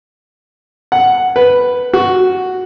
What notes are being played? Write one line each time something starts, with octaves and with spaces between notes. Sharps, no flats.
F#5
B4
F#4